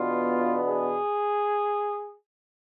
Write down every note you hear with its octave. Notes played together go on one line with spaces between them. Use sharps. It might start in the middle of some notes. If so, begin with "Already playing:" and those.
Already playing: E2 B2 B3 D4 F4
G#4